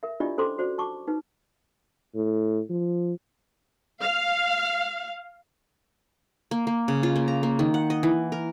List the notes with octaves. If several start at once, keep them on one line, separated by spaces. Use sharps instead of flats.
A#4 E5
D4 E4 F4 G4 D5 D#5
C#4 A4 C5 A#5 C6 D6
F#4 C5 D5
A5 C#6 D6
D#4 B4
A2
F3
F5
A#3
A#3
C#3
F4
A#3
A#5
A#3
D#3
F#5
D#5
E3
A#4